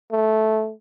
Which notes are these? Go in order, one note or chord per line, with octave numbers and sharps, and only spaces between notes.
A3